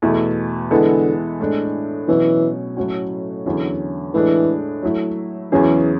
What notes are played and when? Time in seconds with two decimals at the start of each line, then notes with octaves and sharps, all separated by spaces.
0.02 E2 B2 A3 E4
0.71 D3 E3 G#3 B3 E4 A4
1.40 A2 G#3 D4
2.08 B2 E3 F#3 C#4
2.77 A2 F#3 A3 C#4 F#4
3.46 E2 D3 F#3 C#4 E4
4.14 A2 E3 G#3 D4
4.83 F#3 A3 E4
5.51 E2 C#3 E3 F#3 C#4 G#4